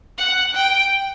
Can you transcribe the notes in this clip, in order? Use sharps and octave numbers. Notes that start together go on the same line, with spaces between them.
F#5
G5